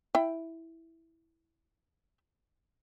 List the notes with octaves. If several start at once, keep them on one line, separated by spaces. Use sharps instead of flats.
E4 G5